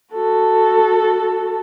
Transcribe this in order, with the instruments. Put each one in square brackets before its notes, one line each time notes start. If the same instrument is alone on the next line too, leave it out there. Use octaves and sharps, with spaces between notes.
[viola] F#4 A4